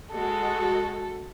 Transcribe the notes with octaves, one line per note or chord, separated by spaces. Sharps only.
G#3 F#4 A4